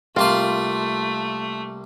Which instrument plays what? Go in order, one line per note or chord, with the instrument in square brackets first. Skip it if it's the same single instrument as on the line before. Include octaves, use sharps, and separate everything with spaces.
[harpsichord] C2 A#3 C6 [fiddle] A3 [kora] F4